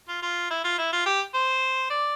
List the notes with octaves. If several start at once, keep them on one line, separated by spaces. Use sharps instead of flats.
F4
F4
E4
F4
E4
F4
G4
C5
D5